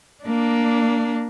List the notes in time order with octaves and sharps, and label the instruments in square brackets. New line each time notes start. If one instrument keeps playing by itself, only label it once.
[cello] A#3 D4